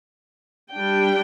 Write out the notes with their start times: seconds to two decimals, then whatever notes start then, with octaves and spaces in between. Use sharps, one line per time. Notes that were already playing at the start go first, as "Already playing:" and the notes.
0.72 G3 D4 G5